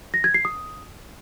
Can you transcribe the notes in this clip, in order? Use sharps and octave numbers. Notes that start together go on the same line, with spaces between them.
A#6
G#6
C7
D#6